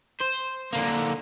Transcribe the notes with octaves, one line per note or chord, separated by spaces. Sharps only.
C5
D3 A#3